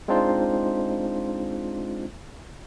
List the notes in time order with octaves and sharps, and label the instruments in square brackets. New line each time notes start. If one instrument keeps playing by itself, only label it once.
[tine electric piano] G#3 C4 D4 D#4 F4 C5